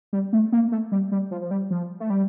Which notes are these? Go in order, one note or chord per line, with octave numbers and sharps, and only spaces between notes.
G3
A3
A#3
A3
G3
G3
F3
F3
G3
F3
A3
G3